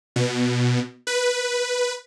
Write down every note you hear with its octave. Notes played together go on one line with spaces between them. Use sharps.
B2
B4